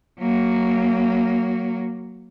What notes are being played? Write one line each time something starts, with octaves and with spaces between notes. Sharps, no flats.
F#3 A#3